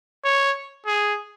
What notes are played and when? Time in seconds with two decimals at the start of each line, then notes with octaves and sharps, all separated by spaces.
0.24 C#5
0.86 G#4